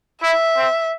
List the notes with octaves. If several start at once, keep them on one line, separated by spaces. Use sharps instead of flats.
E4 E5
C4